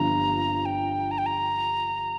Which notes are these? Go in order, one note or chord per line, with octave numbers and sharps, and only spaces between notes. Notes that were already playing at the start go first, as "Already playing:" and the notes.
Already playing: G1 G2 F3 A#5
G5
A#5
G5
A#5